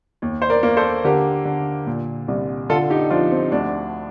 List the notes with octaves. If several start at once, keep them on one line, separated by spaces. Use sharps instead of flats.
D#2
C5
A#4 D5
A#3
A4 C5
D3 G4 A#4
D3
A#2
C2
D3 F4 A4
D#4 G4
F3 D4 F4
C4
D2 D4